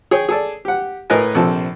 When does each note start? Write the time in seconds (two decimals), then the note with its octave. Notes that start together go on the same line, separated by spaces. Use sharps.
0.11 G#4 C#5 G5
0.29 G#4 A4 D5
0.65 G4 F#5
1.10 A2 A#4 B4 D#5 G#5
1.35 A#1 C3 F3 A4